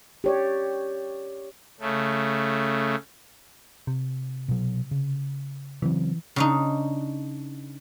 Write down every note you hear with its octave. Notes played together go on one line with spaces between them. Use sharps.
G4 C#5 D5
C#3 A3
C3
B2 F#3
C#3
C#3 E3 F#3 C4
C#3 D4 D#4